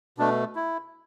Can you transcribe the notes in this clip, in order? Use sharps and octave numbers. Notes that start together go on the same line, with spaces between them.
B2 A3 D4
E4